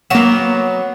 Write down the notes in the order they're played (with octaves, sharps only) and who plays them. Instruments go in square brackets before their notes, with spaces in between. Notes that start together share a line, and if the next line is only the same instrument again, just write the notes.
[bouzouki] F#3 B3 [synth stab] A#3 E7